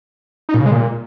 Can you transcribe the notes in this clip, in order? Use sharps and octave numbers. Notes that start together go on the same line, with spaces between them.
D#4
A#2
C#3
G#3
A#2